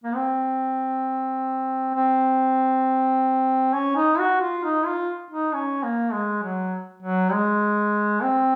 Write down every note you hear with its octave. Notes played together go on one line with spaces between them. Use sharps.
A#3
C4
C4
C#4
D#4
F#4
F4
D#4
F4
D#4
C#4
A#3
G#3
F#3
F#3
G#3
C4